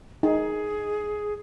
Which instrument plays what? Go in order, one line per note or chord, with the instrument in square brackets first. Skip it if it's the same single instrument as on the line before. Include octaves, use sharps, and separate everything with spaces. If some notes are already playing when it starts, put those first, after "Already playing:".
[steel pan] D#4 [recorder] G#4